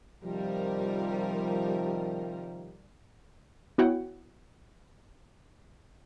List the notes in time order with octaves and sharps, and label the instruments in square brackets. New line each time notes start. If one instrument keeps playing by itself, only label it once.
[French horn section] C3 D#3 F3 [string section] G3 A#4
[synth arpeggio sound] B3 E4 F#4 C#5 F#5 G5